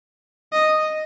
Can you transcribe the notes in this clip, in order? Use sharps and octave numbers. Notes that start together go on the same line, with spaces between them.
D#5